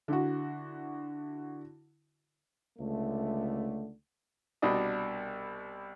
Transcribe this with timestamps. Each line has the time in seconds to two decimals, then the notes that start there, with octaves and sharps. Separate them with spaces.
0.08 D3 E4 F#4
2.79 C#2 D3 A3
4.62 C2 B2 D4 D#5